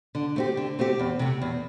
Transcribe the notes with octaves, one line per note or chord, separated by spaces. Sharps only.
D3
A3 C4 G4
D3
A3 C4 G4
E2
C3 A3
E2